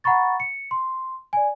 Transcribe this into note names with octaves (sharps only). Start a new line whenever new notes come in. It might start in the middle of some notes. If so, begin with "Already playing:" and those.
F#5 A#5 B5 C#6 A6
C#7
C6
D5 G#5